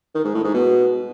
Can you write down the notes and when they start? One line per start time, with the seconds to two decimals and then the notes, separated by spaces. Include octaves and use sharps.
0.15 D#3
0.25 G#2
0.34 A2
0.44 G#2
0.54 B2